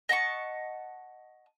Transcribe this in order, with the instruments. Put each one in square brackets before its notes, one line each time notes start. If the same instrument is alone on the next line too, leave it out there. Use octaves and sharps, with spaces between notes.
[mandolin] D#5 F#5 A5 C#6